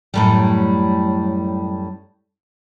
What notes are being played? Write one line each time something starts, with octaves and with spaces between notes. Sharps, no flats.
F#2 A2 G3